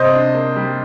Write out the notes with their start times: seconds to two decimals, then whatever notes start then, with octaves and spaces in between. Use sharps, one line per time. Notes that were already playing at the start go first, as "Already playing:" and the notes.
Already playing: C3 C5 D#5
0.13 D4
0.35 A#3
0.56 G3